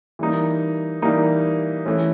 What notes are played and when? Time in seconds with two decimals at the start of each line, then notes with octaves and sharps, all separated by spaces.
0.19 E3 G3 A#3 D#4
1.02 E3 G3 A#3 D#4
1.86 E3 A3 C#4